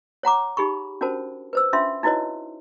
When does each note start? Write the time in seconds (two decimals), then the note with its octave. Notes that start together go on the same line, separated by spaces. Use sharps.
0.23 C#5 F#5 A#5 D6
0.57 D#4 G4 G#4 B5 C#6
1.01 C#4 D4 F#4 A#4 C5 A5
1.53 B4 C5 E6
1.73 C#4 D4 F4 E5 C6
2.03 D#4 E4 F#4 B4 C#5 D#5